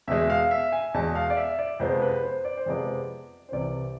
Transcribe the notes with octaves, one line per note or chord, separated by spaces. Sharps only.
E2 B2 G#3 E5
F5
E5
G#5
E2 B2 G#3 A5
F5
D5
E5
D5
F2 C3 F3 G#3 B3 C5
B4
C5
D5
C5
F2 C3 F3 G#3 B3 D5
C5
C2 C3 E3 D5